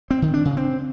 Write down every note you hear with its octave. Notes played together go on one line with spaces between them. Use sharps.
C4
D#3
D4
C#3
C4